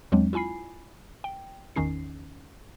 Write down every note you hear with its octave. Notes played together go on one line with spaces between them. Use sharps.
E2 F#3 G#3 C4 D4
E4 F4 G#5 B5 C7
G5
G#1 E2 D#3 C#4 D#4 C7